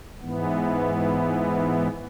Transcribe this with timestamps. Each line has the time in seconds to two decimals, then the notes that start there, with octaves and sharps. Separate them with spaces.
0.20 G#2 E3 B3